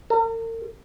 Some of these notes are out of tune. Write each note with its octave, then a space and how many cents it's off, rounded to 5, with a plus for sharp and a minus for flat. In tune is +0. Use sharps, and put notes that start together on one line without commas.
A#4 -45